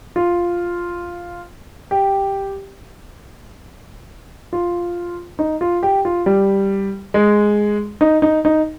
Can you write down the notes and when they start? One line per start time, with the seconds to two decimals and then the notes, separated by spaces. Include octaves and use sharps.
0.16 F4
1.91 G4
4.53 F4
5.39 D#4
5.61 F4
5.83 G4
6.05 F4
6.26 G3
7.14 G#3
8.01 D#4
8.22 D#4
8.45 D#4